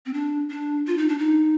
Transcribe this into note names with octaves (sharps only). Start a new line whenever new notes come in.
C4
D4
D4
F4
D#4
D4
D#4